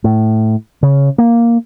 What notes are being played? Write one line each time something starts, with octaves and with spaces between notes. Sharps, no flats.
A2
C#3
A#3